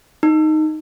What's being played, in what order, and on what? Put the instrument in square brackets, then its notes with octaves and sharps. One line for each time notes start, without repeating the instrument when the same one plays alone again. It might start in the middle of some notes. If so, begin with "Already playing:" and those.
[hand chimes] D#4